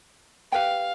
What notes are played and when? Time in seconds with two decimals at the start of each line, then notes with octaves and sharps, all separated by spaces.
0.52 G4 B4 F5 G5